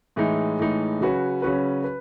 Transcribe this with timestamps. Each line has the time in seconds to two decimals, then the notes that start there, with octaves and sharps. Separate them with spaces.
0.16 A2 E3 G#3 D#4
0.59 A2 E3 G#3 D#4
1.01 C#3 F#3 C#4 F#4 B4
1.42 C#3 F#3 C#4 F#4 B4
1.84 B4